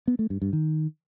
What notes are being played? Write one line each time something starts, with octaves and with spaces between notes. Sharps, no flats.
B3
A3
G2
G2
D#3